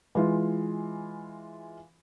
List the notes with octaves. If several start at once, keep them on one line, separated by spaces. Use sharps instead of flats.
E3 G#3 F4